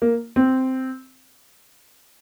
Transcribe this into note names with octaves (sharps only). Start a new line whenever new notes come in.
A#3
C4